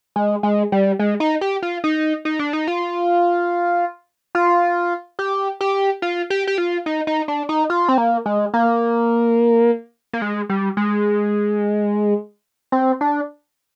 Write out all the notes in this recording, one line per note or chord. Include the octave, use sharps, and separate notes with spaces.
G#3
G#3
G3
G#3
D#4
G4
F4
D#4
D#4
D4
D#4
F4
F4
G4
G4
F4
G4
G4
F4
D#4
D#4
D4
D#4
F4
C4
A#3
G#3
A#3
A#3
G#3
G3
G#3
C4
D4